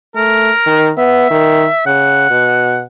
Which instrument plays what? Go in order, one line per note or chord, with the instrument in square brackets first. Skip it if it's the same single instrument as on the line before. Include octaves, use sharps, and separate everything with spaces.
[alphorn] A3 [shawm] A#4
[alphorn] D#3
[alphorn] B3 [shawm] E5
[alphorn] D#3
[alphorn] C#3 [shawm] F#5
[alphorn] B2